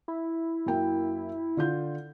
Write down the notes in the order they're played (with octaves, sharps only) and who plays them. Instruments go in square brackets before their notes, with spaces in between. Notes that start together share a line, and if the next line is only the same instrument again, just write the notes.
[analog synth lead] E4
[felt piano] F#2 A#3 G5
D3 F4 G6